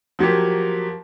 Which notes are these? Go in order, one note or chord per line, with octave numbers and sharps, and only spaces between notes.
F3 F#3 A#3 G4